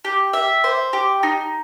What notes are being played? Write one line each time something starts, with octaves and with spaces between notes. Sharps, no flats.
G4
E5
C5
G4
D#4